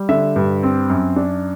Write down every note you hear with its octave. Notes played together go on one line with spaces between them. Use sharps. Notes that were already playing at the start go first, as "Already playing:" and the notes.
Already playing: G3
D3 E5
G2
C4
F#2
D4